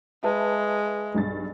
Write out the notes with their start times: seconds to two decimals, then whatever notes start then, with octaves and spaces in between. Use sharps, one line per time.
0.24 G#3 B4 E5 A5
1.14 B1 G2 A6